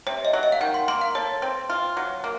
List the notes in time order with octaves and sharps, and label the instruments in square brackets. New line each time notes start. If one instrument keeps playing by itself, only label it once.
[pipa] C3 [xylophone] C#5
[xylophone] D#5
[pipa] F#3
[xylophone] D#5
F5
[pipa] D#3 [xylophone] F#5
[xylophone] C6
[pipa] A#3 [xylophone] C6
[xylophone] F5
[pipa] A4 [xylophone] C#5
[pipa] C4
F4
F#3
A#3